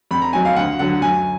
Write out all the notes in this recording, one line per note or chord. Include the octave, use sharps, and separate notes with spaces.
F2 B5
A#5
D#3 F#3 G#5
F5
D2 F#5
D3 F#3 F#5
F#2 G#5